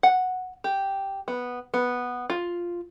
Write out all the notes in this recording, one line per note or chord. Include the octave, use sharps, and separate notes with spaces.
F#5
G4
B3
B3
F4